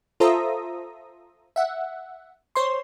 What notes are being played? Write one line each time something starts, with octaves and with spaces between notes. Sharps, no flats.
F4 A4 C5 E5 A#5 D#6
E5 F#5
C5 C#5 C6